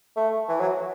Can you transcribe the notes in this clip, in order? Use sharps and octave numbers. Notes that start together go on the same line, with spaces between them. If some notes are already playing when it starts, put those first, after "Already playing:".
A3
E3
F#3